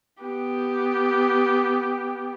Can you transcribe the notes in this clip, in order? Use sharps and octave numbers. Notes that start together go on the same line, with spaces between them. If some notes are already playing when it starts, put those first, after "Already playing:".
B3 G4